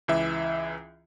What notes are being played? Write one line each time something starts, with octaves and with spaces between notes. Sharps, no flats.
C#2 E3 E5